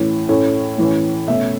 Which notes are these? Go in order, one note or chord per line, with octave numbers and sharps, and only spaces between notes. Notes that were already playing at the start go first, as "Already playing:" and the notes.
Already playing: A2 E3 C#4
A2 A3 C#4
A2 E3 C#4
B2 A3 C#4 E5